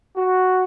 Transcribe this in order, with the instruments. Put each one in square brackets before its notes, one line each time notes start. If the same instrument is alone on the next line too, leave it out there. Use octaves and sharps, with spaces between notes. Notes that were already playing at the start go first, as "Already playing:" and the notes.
[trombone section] F#4